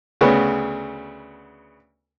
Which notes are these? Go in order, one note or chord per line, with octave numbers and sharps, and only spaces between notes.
D2 C#3 B3